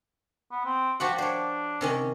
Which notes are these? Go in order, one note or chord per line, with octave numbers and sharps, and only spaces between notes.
B3
C4
F3 F#4 G4 F#5
D4 C5 C#5
C3 D#3 C#4